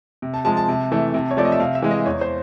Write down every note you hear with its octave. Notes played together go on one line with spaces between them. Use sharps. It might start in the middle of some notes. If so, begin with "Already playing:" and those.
C3
A5
F3 G#3 A5
A5
C3
E3 A3
C3
C#5
F3 A3 D5
D#5
E5
C3 F5
E5
E3 G#3
D#5
E2 C#5
C5